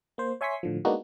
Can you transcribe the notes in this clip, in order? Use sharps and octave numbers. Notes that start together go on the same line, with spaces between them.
A#3 C5
C#5 E5 G#5 C6 C#6 B6
A2 D3 F3
G#3 A#3 B3 D4 D#4 F#4